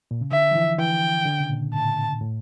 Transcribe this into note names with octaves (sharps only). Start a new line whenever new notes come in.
A#2
C#3
D3 E5
F3
E3
E3 G5
D3
C#3
A#2
A2 A5
A2